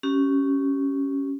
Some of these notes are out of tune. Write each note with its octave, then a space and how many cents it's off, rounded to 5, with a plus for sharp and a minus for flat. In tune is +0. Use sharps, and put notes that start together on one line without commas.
C#4 +0 G4 -25